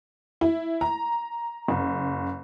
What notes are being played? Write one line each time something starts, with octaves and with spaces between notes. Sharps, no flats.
E4
A#5
F#1